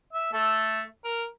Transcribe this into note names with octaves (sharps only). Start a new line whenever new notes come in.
E5
A3 A4
A#4